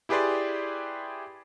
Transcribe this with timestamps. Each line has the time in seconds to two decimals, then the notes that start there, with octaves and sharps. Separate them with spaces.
0.09 E4 G4 G#4 B4 D5 C6